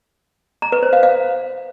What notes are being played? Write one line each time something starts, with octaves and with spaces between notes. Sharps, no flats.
A#5
B4
C5
F5
F5